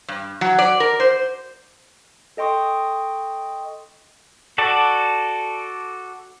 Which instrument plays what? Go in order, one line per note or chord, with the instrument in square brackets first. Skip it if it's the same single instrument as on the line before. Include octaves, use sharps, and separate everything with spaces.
[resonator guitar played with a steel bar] G2
F#3
D5
A#4
C5
[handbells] A4 D#5 G5 C6 C#6 D#6
[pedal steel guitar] F#4 A4 D5